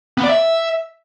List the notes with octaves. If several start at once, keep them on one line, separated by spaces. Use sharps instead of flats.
B3
D5
E5